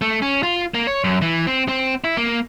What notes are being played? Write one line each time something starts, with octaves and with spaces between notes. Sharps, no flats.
A3
C#4
F4
A#3
C#5
F#2
E3
C4
C4
E4
A#3